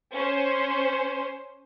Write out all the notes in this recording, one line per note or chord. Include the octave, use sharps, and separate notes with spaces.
C#4 C5